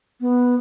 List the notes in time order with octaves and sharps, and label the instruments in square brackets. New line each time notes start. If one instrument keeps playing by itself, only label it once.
[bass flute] B3